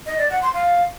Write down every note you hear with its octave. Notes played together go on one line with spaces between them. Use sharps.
D#5
D5
F#5
C6
F5